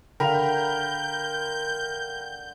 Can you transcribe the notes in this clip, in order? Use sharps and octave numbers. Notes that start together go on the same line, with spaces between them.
D3 A#4 F5 G5 A#5 B5 G6 F7